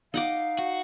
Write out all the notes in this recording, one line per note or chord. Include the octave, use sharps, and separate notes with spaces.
D#4 F5 F#5 D6
F#4